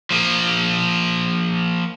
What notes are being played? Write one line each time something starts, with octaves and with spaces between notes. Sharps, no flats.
F3 A#3